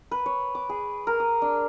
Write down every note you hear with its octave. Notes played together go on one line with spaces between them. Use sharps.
B4
C#5
D6
G#4
A#4
D#6
D4